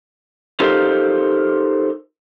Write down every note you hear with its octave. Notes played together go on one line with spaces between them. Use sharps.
D#4 F4 G4 A4 A#4 C5